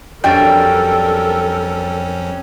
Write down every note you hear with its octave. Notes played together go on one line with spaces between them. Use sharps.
F2 F#3 G3 C#4 D4 A4 A#4 G5